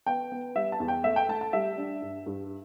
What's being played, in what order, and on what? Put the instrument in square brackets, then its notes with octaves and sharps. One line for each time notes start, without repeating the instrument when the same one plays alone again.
[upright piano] B3 G5
B3
G3 E5
A5
E2
G5
A3 E5
G5
A3 A5
A5
G3 E5
D4
G2
G2